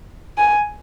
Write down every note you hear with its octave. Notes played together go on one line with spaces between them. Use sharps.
G#5